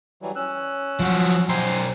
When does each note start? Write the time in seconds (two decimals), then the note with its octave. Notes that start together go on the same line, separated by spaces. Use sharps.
0.22 E3 F#3 G3
0.36 C#4 E6 F#6
0.99 F3 F#3 F#4
1.49 B1 C5 G5 G#5 A#5